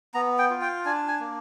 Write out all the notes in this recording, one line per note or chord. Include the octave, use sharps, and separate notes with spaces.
B3 A#5
G5
F4
G5
D4 G#5
G#5
A#3